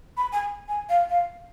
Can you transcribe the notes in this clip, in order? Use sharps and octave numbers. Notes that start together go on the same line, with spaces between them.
B5
G#5
G#5
F5
F5